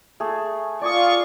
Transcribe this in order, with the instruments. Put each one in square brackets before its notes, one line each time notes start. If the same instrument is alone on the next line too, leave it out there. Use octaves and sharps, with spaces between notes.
[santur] A3 G#4
[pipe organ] F4 C#6 [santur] D5 G#5 D#6